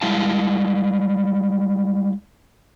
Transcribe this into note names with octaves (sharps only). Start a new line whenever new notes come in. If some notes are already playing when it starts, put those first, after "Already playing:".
G3 G#3 E4 F5 A5